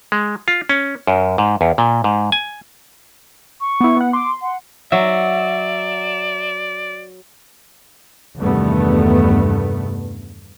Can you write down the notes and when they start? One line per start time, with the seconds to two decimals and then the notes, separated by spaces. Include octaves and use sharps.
0.12 G#3
0.48 F4
0.69 C#4
1.07 F#2
1.38 G#2
1.61 E2
1.78 A#2
2.04 G#2
2.32 G#5
3.61 C#6
3.80 B3 E4
3.97 B3 F#5
4.13 C6 D6
4.42 F#5
4.92 F#3 D5 E5
8.39 E2 G2 C3 D#3 A3 B3